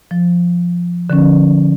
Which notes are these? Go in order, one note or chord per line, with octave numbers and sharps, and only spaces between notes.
F3
D3 F3 C#4